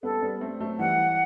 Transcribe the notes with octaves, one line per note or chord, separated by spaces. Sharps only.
G3 B3 A4
G3 B3
A3 C4
F#3 A3
E3 G3 F#5